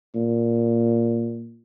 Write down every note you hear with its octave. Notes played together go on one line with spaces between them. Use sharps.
A#2